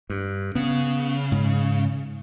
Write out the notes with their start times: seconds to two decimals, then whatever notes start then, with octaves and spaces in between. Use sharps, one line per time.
0.10 G2
0.55 C#3 B3
1.32 G#2